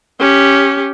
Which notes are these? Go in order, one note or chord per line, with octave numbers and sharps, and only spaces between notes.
C#4 G4